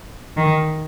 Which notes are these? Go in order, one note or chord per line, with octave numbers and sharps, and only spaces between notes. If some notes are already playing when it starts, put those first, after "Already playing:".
D#3